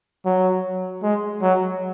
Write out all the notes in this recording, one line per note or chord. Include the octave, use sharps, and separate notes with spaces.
F#3
G#3
F#3